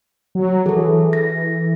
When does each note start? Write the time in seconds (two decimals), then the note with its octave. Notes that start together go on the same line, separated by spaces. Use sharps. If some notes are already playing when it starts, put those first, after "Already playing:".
0.35 F#3
0.66 E3 G#4 A4
1.13 A#6